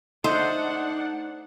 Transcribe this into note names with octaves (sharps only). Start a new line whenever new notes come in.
A3 D4 D#4 C5 D#5 F#5